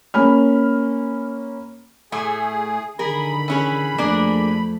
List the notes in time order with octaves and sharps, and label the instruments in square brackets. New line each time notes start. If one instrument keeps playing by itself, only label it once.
[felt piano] A#3 C#4 B5 F6
[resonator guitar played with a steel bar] A2 A3 [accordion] G#4
[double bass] D3 D#3 [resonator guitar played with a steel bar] G#4 A#4 [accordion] B5
[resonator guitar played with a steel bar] E3 C#4 G#4
[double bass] F2 A3 [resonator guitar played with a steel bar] A#3 D4 G#4